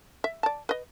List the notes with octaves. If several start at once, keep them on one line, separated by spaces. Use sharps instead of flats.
E5
D5 A5
B4 D#5